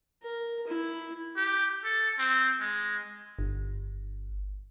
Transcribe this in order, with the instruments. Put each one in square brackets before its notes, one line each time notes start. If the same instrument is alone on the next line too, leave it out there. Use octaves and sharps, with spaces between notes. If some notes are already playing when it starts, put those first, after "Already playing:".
[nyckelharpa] A#4
E4
[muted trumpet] G4
A4
C4
G#3
[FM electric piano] G1